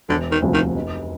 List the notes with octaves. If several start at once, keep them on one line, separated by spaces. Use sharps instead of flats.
E1 D3
D#3
D2 C3 F3
D#3
F1